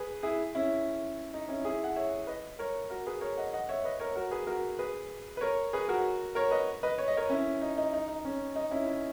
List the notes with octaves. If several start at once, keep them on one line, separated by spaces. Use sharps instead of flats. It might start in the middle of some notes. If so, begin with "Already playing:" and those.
Already playing: G#4 B4
E4 G#4
C#4 E4
D#4
C#4 E4
E4 G#4
F#5
C#5 E5
B4 D#5
A#4 C#5
F#4 A#4
G#4 B4
A#4 C#5
D#5 F#5
D#5 F#5
C#5 E5
B4 D#5
A#4 C#5
F#4 A#4
G#4 B4
F#4 A#4
G#4 B4
B4
A#4 C#5
G#4 B4
F#4 A#4
A#4 C#5
B4 D#5
B4 D#5
C#5
D#5
A#4 C#5
C#4 E4
D#4
D#4
D#4
D#4
C#4
D#4
C#4 E4
C#4 E4